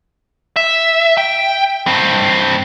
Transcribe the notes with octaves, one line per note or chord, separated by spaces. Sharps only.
E5
G5
G2 C4